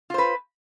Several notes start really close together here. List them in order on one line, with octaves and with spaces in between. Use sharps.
F4 C5 B4